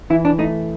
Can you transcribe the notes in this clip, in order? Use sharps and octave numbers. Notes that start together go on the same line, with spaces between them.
E3 E4
D4
A3 D#4